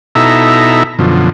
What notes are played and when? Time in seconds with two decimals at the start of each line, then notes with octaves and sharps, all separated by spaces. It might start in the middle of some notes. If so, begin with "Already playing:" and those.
0.15 B2 D#4 E4 A4 E5 A#5
0.99 F#2 B2 D3 F3